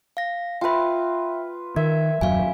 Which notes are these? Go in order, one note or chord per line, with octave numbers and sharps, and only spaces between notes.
F5 A#6
F4 B4 E5 G5
D#3 A#4 E5 G#6
D#1 F#2 F#3 F5 G#5